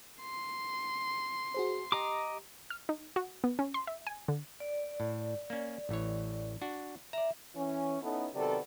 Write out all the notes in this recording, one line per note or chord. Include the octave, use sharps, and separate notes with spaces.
C6
F#4 G#4 C5
G4 D#5 A#5 D6
F6
D#4
F#4
B3
C#4
C6
E5
G#5
D3
D5
A2
A#3 C#4
A1 E3 C#5
D4 F#4
D5 E5 A#5
E3 C#4
B3 C#4 D#4 E4 A4
C3 D#3 F#3 B3 A4 D5